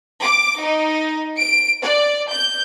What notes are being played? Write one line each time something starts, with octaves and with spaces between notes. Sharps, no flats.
D6
D#4
D7
D5
G6